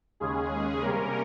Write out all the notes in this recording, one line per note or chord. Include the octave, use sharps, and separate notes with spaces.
D#2 C#3 G#3 C#4 G#4
C3 G3 A#3 C#4 A#4